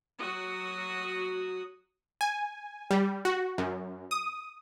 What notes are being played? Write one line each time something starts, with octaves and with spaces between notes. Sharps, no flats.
F#3 F#4 D#6
G#5
G3
F#4
F#2
D#6